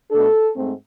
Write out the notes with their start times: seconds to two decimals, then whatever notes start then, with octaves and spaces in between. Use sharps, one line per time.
0.11 B2 A3 D4 A4
0.55 G#2 A3 C4